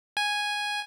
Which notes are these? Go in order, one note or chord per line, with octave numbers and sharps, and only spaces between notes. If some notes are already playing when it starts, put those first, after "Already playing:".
G#5